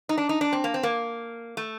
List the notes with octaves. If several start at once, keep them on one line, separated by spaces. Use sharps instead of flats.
D#4
D4
D#4
D4
C4
A#3
C4
A#3
A3